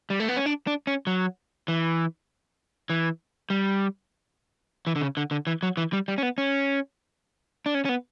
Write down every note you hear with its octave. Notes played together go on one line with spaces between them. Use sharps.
G3
A3
B3
C#4
D4
D4
C#4
F#3
E3
E3
G3
E3
D3
C#3
D3
D3
E3
F#3
E3
G3
G3
C#4
B3
C#4
D4
C#4
C#4
B3